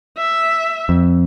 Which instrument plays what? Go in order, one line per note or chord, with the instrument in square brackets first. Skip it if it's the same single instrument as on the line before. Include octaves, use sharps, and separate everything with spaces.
[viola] E5
[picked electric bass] F2